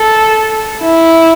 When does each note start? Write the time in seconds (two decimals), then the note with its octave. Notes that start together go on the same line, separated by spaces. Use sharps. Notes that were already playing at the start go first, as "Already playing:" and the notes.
Already playing: A4
0.81 E4